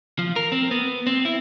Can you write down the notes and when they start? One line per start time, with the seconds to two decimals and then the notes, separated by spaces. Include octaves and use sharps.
0.19 F3
0.36 A#4
0.52 C4
0.71 B3
1.07 C4
1.25 E4